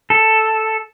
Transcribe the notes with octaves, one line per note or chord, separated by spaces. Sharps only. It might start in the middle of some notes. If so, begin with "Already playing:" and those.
A4